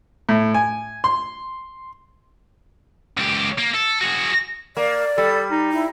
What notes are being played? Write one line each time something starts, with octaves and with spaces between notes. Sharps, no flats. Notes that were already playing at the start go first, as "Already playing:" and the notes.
A2
G#5
C6
C#2 G4
A#3
A4
F#4 G#4
A#3 D5
G3 A4
D#4
E4